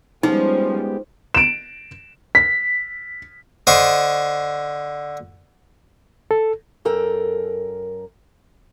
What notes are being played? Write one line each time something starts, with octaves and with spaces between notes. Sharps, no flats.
F3 G3 G#3 B3 C#4 D#4 G4
D7 E7
B6
D3 C5 D#5 C#6
A4
F#2 A4 A#4 G5